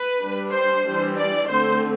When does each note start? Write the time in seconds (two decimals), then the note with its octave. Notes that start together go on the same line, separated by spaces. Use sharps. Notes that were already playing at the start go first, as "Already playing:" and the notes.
Already playing: B4
0.22 G3 D4
0.54 C5
0.86 E3 G3 D4
1.19 D5
1.51 D3 A3 C4 C5